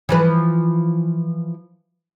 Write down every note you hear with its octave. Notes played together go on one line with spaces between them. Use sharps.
E3 F3 B4